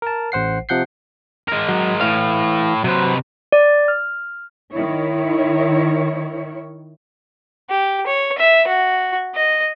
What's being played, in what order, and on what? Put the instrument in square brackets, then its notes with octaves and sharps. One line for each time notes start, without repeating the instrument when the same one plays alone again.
[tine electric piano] A#4 A5
A1 C5 F#5 C7
C3 F3 F#5 G6 C7
[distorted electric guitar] G#3 A#4
[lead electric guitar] F#3
[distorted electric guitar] A2 [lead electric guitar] E3 F5
[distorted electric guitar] C3 B4 [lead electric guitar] F#3 C5
[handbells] D5
F6
[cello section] D#3 E4 C#5
[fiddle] G4
C#5
E5
F#4
D#5